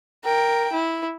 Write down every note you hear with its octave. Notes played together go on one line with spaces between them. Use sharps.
A#4 G5
E4